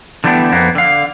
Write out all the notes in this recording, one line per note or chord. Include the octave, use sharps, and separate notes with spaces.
D3 E3 G3 A3 B3 D4
F2 A#3 B3
D3 F5